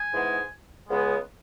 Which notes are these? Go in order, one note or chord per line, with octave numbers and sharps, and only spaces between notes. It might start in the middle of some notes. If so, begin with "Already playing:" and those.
Already playing: G#5
G#2 E3 G#3 B3
C#2 C#3 G#3 B3